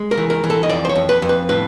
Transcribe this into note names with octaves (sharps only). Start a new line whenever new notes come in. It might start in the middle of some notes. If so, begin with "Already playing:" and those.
Already playing: G#3
A#4
E3
A#4
E3
A4
D#5
F2 D5
C5
C#5
F2
B4
F2
B4
A2 B4